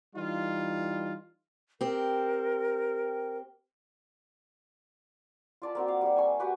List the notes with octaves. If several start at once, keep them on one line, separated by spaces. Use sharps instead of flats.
E3 G3 D#4 F4
C4 G4 A#4
F4 D5 A5 B5
A#3 C4 F#4
F5
G3 G4
G#5 C#6
F#4 G4 B4 F#5